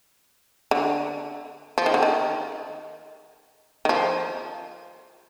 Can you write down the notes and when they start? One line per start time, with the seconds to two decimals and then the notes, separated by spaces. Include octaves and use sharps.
0.71 D3
1.78 F3
1.86 D#3
1.94 D3
2.03 D#3
3.85 D#3
3.89 F3